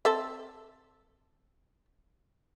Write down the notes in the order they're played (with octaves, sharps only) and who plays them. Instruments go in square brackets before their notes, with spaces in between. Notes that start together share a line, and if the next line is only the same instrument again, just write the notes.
[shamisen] C4 A4 E5